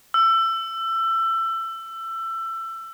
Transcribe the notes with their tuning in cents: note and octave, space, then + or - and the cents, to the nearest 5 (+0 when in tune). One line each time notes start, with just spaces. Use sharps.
E6 +25